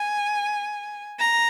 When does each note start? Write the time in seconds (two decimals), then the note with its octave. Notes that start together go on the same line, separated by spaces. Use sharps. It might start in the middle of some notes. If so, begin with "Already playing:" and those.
Already playing: G#5
1.19 A#5